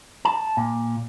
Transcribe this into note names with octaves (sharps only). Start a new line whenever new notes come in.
A5
A#2